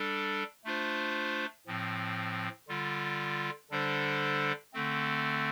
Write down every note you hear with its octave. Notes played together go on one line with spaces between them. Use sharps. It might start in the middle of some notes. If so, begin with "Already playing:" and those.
Already playing: G3 D4 A4
A3 D4 F4 C5
A2 F3 C4
D3 G3 F4
D3 G3 D4 A4 C5
D3 A3 C4